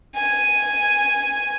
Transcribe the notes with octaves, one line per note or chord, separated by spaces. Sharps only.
G#5